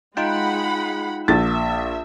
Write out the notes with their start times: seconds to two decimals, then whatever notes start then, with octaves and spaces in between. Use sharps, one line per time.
0.17 G#3 D#4 F4 F#5 G5 B5
1.28 A#1 E5 A6